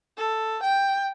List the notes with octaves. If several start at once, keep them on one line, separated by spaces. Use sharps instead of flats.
A4
G5